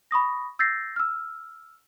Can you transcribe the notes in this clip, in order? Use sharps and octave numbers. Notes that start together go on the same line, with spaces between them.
B5 C#6 D#6 A#6
E6 G6 A6 A#6 C7
E6 F6